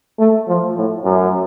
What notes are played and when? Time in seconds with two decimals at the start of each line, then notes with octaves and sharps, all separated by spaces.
0.19 A3
0.48 F3
0.76 A2
1.05 F#2